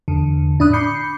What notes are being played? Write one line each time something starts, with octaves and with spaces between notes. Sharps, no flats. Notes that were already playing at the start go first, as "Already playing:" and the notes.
E2 D3
A2 D4 B5 D#6 F#6
B5 D6 G6 C7 C#7